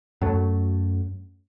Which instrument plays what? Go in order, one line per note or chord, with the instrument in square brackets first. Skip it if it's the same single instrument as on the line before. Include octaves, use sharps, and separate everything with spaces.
[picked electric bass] F#2 F#3 A3